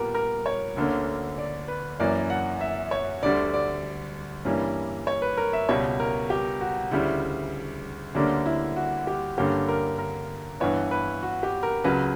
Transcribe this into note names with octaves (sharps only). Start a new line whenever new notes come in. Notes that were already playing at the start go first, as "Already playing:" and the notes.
Already playing: A#2 G3 B3 A#4
A#4
C#5
D2 D3 A#3 C#4
D5
B4
F#2 E3 A#3 C#4 D5
F#5
E5
C#5
D2 D3 G3 D5
D5
G2 E3 G3 A#3 C#4
C#5
B4
A#4
E5
C#2 B2 G3 C#5
A#4
G4
F#4
D2 C#3 G3 E4
D2 D3 G3 A#3 C#4 D4
E4
F#4
G4
G2 D3 A#3 C#4 G4
A#4
A#4
G2 E3 B3 C#5
B4
F#4
G4
A#4
C#2 C#3 F#3 C#4 B4